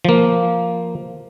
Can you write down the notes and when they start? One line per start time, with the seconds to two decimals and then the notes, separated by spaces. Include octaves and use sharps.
0.05 F3 A#3